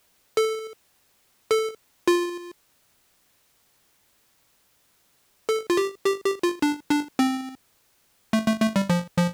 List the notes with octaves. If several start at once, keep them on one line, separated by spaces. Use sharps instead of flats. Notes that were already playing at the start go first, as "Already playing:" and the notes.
A4
A4
F4
A4
F4
G4
G4
G4
F4
D4
D4
C4
A3
A3
A3
G3
F3
F3